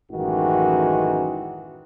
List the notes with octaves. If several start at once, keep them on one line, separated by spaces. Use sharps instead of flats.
A1 F#2 D#3 E3 G#3 F#4